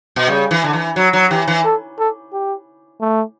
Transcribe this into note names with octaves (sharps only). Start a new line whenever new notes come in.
B2
C#3 G3
E3
D3
E3
F#3 F#4
F#3
E3 G4
E3
A4
A4
G4
A3